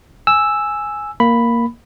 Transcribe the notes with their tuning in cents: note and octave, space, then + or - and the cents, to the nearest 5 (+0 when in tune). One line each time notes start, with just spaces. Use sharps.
G#5 +0 E6 +0
A#3 +0 B5 +0